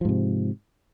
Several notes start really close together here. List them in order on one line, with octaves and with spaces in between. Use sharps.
F3 G#2 C3